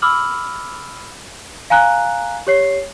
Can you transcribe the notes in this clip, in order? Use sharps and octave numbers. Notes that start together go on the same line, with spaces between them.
B5 D6 E6 F6 F#7
F5 G#5 A#5 F#6
G4 C#5 C7